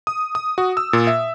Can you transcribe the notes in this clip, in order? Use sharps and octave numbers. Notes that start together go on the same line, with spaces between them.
D#6
D#6
F#4
E6
A#2
E5